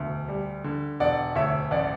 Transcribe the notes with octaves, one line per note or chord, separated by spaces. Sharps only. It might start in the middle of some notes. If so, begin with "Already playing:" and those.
Already playing: E1 D2
G3
D3
E1 D5 F#5
D2 C#5 E5
A1 D5 F#5